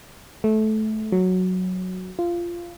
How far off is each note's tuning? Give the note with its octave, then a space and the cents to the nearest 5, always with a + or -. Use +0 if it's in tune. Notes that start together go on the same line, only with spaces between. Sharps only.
A3 -20
F#3 -5
F4 -15